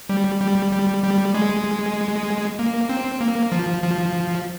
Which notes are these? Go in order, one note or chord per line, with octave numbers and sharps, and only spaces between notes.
G3
G3
G3
G3
G#3
A#3
C4
A#3
F3
F3